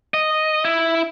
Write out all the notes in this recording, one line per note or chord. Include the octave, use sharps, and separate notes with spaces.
D#5
E4